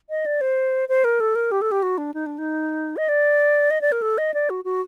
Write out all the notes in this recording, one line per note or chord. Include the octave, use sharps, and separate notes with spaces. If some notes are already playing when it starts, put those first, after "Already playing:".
D#5
D5
C5
C5
A#4
A4
A#4
G4
A4
G4
F#4
D4
D#4
D4
D#4
D#5
D5
D#5
D5
A#4
A4
D#5
D5
F#4
F#4